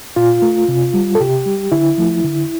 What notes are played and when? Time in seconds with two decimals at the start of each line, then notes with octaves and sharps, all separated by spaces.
0.16 A#2 F4
0.42 A3
0.68 C3
0.94 G3
1.15 A4
1.21 C3 G4
1.46 G3
1.72 D3 E4
1.98 F3 A3
2.24 D3